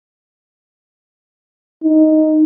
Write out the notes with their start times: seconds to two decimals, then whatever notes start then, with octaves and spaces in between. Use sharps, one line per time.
1.84 D#4